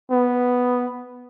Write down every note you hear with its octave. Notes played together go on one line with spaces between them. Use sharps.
B3